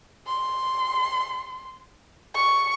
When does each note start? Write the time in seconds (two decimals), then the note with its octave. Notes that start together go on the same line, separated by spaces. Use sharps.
0.27 C6
2.35 C#6